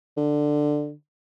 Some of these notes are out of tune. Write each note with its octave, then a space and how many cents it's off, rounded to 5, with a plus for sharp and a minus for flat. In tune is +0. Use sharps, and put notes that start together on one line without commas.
D3 +10